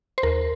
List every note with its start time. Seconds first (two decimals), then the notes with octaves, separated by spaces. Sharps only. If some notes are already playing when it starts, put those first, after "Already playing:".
0.18 C5
0.23 D#2 A#4